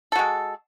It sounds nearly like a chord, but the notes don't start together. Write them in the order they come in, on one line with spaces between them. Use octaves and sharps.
A4 F#4 G#3